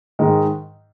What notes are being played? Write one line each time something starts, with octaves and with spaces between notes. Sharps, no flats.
G#2 D#3 G#3